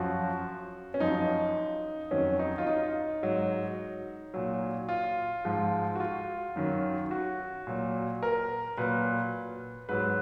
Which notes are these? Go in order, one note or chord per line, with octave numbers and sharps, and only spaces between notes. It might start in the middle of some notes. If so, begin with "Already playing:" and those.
Already playing: F#2 F3 F#4
C#4
F#2 F3 D#4
F2 D#3 F#3 C#4
D#4
F4
D#4
G#2 F#3
A#2 F#3
F4
G#2 F3
F#4
F4
F#2 D#3 F#3
F#4
A#2 F#3
A#4
A#2 F#3 B4
G#2 F#3 B4